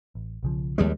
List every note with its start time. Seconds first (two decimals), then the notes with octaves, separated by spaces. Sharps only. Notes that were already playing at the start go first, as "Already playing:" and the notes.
0.15 A1
0.43 B1 C#3 F3
0.78 D#2 F3 G3 G#3